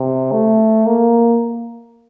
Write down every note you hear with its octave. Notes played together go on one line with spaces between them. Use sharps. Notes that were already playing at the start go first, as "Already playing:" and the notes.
Already playing: C3
A3
A#3